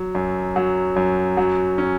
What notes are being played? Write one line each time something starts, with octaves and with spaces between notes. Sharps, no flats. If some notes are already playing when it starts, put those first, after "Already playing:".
Already playing: F#3
F#2
F#3
F#2
F#3
C#4